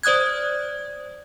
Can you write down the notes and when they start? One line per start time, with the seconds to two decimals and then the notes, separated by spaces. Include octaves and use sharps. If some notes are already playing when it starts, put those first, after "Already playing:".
0.03 C5 D5 D#6 F#6 G#6